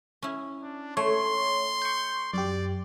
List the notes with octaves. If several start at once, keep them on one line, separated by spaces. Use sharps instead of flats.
C#4 E4
D4
A3 C#5 C6
C#6 G6
F#2 G4 D5